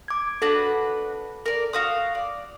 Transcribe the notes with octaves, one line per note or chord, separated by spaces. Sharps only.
D6 G#6
D4 F#4 A4 B4
A#4 D5
F#4 F5 D#6
D5